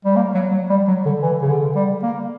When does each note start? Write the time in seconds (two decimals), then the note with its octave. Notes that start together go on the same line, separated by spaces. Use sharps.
0.05 G3
0.16 A#3
0.34 F#3
0.51 F#3
0.70 G3
0.87 F#3
1.05 D3
1.22 E3
1.42 C#3
1.49 D3
1.76 G3
2.03 A#3